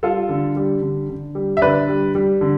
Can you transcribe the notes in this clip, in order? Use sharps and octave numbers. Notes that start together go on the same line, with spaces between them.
G3 F4 A4
D3
G3
D3
D3
G3
E5
D3 B4 D5
G3
G3
D3